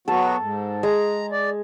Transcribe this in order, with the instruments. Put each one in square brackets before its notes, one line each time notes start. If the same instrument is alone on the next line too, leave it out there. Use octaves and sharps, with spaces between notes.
[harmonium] F#3 B3 F#4 [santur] A4
[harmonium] G#2
[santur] G#3 [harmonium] A#5
[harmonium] D5